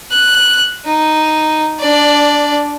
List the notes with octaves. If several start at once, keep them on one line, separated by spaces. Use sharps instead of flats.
F#6
D#4
D4 D5